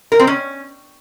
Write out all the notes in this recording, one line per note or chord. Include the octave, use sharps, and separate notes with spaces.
A#4
C4
C#4